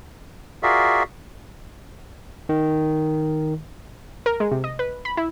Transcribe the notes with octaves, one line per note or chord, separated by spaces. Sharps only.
F4 F#4 G#4 A#4 D5 E5
D#3
A#4
G#3
C3
D#5
B4
B5
E4